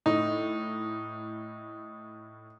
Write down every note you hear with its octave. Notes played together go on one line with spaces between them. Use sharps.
A2 D#4